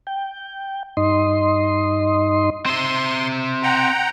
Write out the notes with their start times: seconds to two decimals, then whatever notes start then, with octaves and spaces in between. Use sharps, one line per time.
0.07 G5
0.97 G2 D#4 D#5 C6
2.66 C4 E5 C6
3.63 F#5 G5 A#5